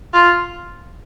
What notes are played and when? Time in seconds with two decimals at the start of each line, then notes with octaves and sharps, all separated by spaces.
0.14 F4